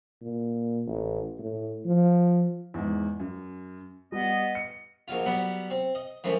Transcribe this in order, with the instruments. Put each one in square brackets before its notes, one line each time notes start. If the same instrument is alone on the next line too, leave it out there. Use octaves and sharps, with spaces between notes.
[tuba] A#2
A1
A2
F3
[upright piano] E2 G#2
F#2
[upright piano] G3 [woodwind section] B3 D#5
[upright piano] C#7
[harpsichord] A#1 F#3 F4
F#3 G3 B3
C4
D#5
F#2 A2 E3 F3